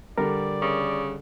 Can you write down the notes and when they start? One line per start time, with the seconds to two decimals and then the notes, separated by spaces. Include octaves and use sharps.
0.18 D3 G3 A#4 D5
0.62 C#3